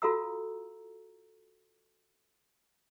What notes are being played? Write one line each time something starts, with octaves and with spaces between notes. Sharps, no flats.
F4 F#4 A4 F5 A#5 E6